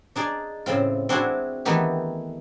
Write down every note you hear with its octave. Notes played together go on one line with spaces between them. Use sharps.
D4 D#4 G#4 D5
A2 C#3 C4 F4
C4 D4 E4 F#4 G#4
D#3 E3 A3 B3 D#4 G4